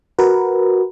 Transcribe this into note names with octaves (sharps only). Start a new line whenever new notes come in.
F#4 A#4 B4